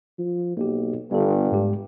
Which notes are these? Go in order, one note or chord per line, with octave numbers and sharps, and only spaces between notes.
F3
B1 A#3 G4
G1 G2 B3 A4
G#2 G#3 G4